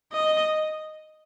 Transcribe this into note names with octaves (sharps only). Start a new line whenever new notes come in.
D#5